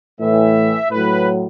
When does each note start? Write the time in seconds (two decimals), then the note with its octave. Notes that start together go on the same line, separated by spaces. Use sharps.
0.19 A2 E3 E5
0.90 A2 F#3 B4